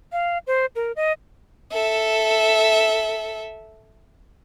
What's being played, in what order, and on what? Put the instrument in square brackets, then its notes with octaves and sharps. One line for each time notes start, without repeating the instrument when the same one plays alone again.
[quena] F5
C5
A#4
D#5
[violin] A4 E5